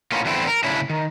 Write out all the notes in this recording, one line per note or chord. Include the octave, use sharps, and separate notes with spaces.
A2 A#3 B3 C#4 F4
E2 D3 A3 C4 E4
A#4
A2 C#3 C#4 D4 E4
D#3